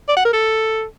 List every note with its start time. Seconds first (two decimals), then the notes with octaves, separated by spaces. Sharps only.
0.08 D5
0.17 F#5
0.25 A#4
0.33 A4